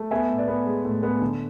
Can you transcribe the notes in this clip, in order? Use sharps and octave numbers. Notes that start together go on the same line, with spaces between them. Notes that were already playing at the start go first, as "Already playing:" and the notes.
Already playing: A3
B3 E5 G#5
A2
B4 D5
B3
G#3
A2
B3
D3